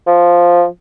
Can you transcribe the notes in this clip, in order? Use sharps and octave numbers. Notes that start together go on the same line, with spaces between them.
F3